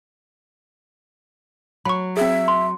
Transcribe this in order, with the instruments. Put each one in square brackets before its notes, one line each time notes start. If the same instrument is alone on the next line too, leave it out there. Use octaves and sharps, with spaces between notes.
[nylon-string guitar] F#3 [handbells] B5 C#6
[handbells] C4 G#4 [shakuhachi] E5
[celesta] C6